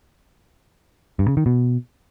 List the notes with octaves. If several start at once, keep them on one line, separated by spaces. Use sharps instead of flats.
G2
C#3
D#3
B2